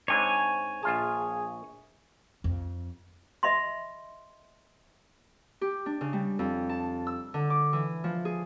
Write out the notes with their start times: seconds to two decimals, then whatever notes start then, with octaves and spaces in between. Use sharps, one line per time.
0.08 G#2 C4 D4 C#5 G#5
0.83 A#1 F4 G#4 A5
2.44 F2
3.43 D#5 E5 B5 C6
5.61 G4
5.86 D4
6.01 C#3
6.13 G3
6.39 F2
6.69 A5
7.07 E6
7.34 D3
7.50 D6
7.73 E3
8.04 F3
8.25 G#4